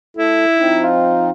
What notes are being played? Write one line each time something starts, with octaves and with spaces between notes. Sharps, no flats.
A3 E4 A4
F3 C4 D#4
F4